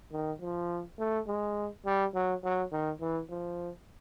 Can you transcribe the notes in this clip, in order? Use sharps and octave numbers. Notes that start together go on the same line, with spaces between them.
D#3
F3
A3
G#3
G3
F#3
F#3
D#3
E3
F3